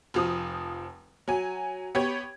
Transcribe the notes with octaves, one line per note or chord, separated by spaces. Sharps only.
F1 F3 D#6
F#3 G#5
B3 G4 C#5 G#6